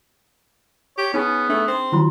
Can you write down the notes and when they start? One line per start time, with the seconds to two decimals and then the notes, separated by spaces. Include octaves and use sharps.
0.98 G4 C#5
1.14 B3 C#4 D#4 G#4 G#5
1.49 A3 D4
1.68 C4
1.92 D#3 F#3 E4 F4 C6